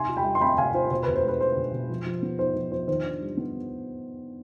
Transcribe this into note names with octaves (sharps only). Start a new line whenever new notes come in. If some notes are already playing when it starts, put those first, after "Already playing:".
Already playing: C3 D#4 G#5 C6
F4
G5 B5
G3
C6
C4 G5 B5
C3 F5 G#5
F4 C5
B2 C5
B4
B2
C5
G#3 B4
D4 C5
B2
B2
F3
F3
B3
D#4 C5
F3
F3 C5
D#3 C5
D4
G3
B3